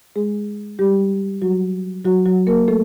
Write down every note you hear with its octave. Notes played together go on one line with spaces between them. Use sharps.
G#3 G#4
G3 G4
F#3 F#4
F#3 F#4
F#3 F#4
A#3 A#4
A3 A4